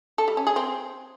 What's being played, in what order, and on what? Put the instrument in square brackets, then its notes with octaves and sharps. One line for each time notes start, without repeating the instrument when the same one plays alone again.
[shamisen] A4
G3
C#4
G#4
C4